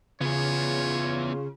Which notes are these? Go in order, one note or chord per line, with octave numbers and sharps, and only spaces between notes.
C#3 B3 F4 G#4 C#5